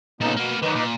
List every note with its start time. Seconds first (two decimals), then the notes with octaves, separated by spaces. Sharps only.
0.21 A#2 C#3 B3 D#4 A4
0.36 B2 A#3 B3
0.62 D#3 F#3 D#4 B4 D6
0.75 A#2